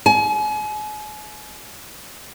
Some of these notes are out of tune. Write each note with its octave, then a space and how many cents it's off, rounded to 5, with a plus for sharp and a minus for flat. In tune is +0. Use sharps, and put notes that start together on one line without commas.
G#5 +40